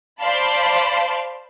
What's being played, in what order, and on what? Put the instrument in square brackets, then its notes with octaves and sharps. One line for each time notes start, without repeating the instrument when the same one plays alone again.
[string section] C5 D5 F5 A5 B5 C6